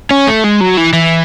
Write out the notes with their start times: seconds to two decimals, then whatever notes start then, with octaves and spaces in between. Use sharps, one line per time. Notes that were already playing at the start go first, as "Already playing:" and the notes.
0.11 C#4
0.27 A3
0.44 G#3
0.60 F#3
0.77 E3
0.93 E3